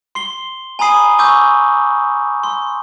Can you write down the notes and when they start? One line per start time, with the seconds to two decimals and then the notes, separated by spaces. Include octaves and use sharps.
0.15 C6 C7 G7
0.79 G#5 A#5 B5 D#6 C7 D#7
1.18 G#5 C#6 D6 E6 G6
2.43 C6